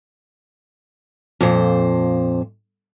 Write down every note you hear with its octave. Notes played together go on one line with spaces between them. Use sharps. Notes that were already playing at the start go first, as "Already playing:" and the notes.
F2 A#2 C5